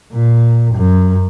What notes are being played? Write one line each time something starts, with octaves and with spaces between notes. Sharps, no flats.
A#2
F#2